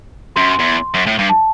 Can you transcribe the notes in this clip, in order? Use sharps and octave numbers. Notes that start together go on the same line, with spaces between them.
F#2 C6
E2
F#2
A2
G2
A5